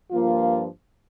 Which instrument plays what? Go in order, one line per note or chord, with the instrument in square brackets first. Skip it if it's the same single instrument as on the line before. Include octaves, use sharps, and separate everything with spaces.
[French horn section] G2 F3 A#3 F4